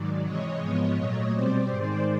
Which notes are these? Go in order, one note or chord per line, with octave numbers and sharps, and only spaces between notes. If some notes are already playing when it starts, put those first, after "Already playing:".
Already playing: G#2 D#3 F#3 D5
C3 E3 G#3 C#5 D#5
G#2 F3 G#3 B3
A#2 F#3 A3 C#5 D#5
B2 G3 C4 C5 D5
G#2 D#3 G#3